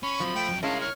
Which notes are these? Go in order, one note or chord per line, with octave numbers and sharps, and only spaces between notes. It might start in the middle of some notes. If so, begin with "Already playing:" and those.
C#4 B5 C#6
F3 F#3 C4
A3 G5
F2 F#3
G#3 C#4 E4 A#4 F5 A5
C#5 F6